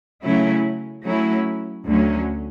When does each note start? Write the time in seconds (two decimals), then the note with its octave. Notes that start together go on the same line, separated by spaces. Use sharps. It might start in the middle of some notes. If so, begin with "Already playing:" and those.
0.22 C#3 F#3 A3 C#4 E4
1.04 F#3 A3 C#4 E4
1.86 D2 D3 F#3 C#4